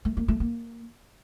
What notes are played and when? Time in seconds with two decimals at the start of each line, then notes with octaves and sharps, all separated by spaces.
0.05 A3
0.17 A#3
0.28 A3
0.40 A#3